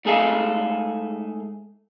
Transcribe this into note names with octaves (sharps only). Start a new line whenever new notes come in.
G#2 A3 G#4 A4 F5